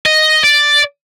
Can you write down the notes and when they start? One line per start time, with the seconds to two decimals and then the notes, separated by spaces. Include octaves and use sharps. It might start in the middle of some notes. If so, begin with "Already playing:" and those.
0.06 D#5
0.44 D5